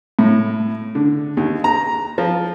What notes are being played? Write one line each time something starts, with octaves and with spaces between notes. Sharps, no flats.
A2
D3
D#2
A#5
F3